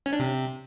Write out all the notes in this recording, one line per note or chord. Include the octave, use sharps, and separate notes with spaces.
C#4
D4
C3